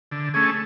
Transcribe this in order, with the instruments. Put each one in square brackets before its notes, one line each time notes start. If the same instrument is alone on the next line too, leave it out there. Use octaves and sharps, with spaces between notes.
[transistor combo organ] D3
A3 C#4 G#4